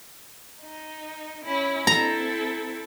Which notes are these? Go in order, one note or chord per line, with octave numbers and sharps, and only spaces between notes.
D#4
C#4 E4
C4 E4 A4 A#5